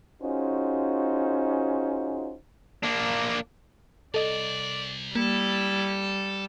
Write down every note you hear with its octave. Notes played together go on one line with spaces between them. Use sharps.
C#4 D#4 F4 F#4 G#4 C5
A#3 D4
C2 A4 D5 D#5
G3 A#3 E4 A4